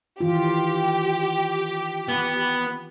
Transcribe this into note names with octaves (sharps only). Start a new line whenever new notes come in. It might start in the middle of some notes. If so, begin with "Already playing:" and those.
D#3 E3 F4 G4
B3